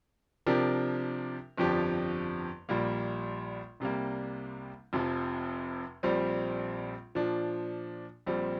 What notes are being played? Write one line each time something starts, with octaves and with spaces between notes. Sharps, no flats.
C3 F3 D4 G4 A#4
G1 F2 F3 D4 G4
A#1 A#2 G3 A#3
C2 C3 G3 A#3
F1 F2 C3 F3
A#1 A#2 G3 C4
A#2 F3 D4
A#1 A#2 G3 C4